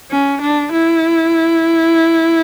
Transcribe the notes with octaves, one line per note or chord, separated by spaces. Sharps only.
C#4
D4
E4